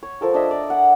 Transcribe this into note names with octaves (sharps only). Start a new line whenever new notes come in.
C#5
F3 A4 A#4
D4 D#5 E5
D5
F#5